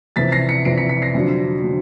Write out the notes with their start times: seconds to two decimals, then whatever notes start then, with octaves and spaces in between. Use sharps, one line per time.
0.16 F2 C3 E3 A6 B6
0.32 A#6 C7
0.49 B6 C#7
0.65 F2 C3 E3 C7 D7
0.77 B6 C#7
0.89 B6 C#7
1.02 A#6 C7
1.15 F2 D3 F#3
1.64 D3 F#3